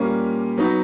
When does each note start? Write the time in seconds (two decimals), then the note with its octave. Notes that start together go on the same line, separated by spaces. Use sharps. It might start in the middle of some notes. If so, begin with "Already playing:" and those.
Already playing: A#2 G3 A#3 C#4
0.58 F#3 B3 D#4 F#4